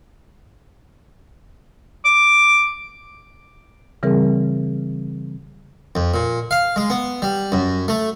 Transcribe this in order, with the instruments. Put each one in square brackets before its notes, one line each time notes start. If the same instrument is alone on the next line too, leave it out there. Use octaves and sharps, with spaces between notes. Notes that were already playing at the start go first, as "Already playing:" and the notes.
[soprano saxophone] D6
[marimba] C#3 E3 G3 C4 G#4 A#4
[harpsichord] F2
A#2
F5
G#3
B3
G3
F#2
A3